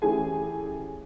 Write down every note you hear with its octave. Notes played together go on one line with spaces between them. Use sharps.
E3 A3 C#4 G4 G#4 G#5